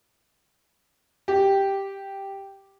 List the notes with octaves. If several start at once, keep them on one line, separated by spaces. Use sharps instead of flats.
G4